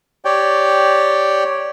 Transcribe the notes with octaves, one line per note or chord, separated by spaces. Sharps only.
G4 C#5 D5 G5